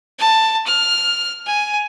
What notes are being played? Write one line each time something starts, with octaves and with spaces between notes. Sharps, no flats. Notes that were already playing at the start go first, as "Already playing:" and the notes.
A5
F6
G#5